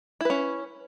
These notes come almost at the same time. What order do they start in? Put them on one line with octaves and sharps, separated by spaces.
E4 B4 C#4